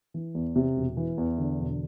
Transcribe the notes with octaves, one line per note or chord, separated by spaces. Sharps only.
E3
E2
C3
E1
E3
E2
D3
E1